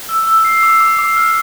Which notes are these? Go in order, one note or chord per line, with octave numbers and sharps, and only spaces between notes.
E6
E6
C7
D6
D6
D6
F6